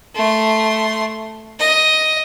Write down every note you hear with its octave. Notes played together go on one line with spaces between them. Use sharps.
A3 C6
D#5